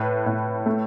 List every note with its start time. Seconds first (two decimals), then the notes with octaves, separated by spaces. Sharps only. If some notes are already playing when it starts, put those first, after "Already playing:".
Already playing: A2 B4
0.26 A2
0.66 A3